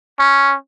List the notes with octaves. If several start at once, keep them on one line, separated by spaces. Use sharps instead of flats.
C#4